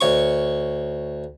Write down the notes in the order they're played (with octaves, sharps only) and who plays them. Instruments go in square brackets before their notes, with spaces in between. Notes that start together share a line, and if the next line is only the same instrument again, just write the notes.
[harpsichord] D2 C#5 C#6